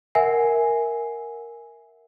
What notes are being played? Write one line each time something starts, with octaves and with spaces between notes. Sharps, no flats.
A#4 E5 F#5 G#5 C7